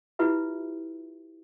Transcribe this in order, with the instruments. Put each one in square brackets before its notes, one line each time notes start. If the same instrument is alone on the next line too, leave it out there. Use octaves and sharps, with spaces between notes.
[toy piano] E4 F4 G4 B4 E5